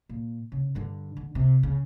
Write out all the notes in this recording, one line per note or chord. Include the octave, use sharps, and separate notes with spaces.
A#2
C#3
G2 D3
D3
C3
C#3